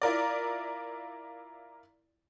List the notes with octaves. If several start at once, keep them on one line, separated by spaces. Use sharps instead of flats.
E4 F4 A#4 D5